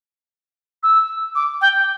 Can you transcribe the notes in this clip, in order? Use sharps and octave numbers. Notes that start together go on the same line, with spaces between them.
E6
D6
G5